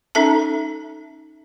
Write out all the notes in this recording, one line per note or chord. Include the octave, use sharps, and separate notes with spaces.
C#4 D#4 A4 E5 A5